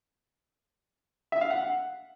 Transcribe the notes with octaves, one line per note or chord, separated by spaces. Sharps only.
E5
F5
F#5